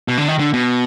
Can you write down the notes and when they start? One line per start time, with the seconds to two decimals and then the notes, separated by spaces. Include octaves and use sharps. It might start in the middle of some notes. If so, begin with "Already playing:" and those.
0.08 B2
0.18 D3
0.28 D#3
0.39 D3
0.54 B2